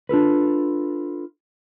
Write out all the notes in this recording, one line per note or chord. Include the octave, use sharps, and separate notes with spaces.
D4 F4 A4 B4